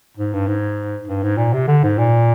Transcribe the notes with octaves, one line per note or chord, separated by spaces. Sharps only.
G#2
G2
G#2
G2
G#2
A#2
C3
D3
G#2
A#2